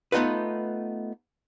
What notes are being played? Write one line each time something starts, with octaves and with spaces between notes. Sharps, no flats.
A3 B3 D#4 F4 B4